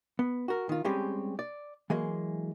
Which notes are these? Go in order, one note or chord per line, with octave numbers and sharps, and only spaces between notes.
B3
F#4 A#4
D#3 F4
G3 G#3 C4 C#4 G4
D5
E3 F#3 G#3 A#3